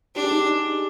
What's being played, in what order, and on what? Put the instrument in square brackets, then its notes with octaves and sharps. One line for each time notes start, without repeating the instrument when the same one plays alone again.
[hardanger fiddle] D4 [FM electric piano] G4
[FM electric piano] G#4
D#4 G4